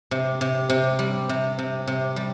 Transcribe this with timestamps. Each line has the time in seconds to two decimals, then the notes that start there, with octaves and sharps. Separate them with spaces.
0.11 C3
0.41 C3
0.70 C3
0.99 G3
1.29 C3
1.59 C3
1.87 C3
2.16 G3